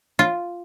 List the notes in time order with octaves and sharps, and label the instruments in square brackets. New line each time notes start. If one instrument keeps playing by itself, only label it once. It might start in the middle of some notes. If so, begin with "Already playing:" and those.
[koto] F4